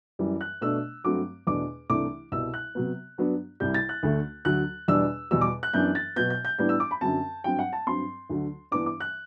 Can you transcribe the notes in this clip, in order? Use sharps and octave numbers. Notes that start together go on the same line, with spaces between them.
F#2 E3 G3
F#6
B2 A3 D4 E6
G2 F#3 A3 C4 D6
E2 B2 A3 D4 D6
C2 C3 E3 A3 D4 D6
C2 B2 G3 E6
F#6
C3 F#3 B3
G2 F#3 B3 D4
C2 C3 G3 G6
A6
F#6
D2 D3 A3
D2 D3 F#3 F#6
E2 B2 G3 D4 E6
E2 B2 G3 E6
D6
F#6
F#2 E3 B3 D4 G6
A6
B2 F#3 B3 G6
G6
G6
A2 E3 G3 B3 D4 G6
E6
D6
B5
F#2 D3 F#3 C4 A5
G2 F#3 C4 G5
F#5
A5
G2 F#3 C4 C6
D2 D3 F#3
G2 E3 B3 D4 D6
D6
F#6